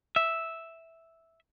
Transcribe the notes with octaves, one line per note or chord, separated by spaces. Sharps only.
E5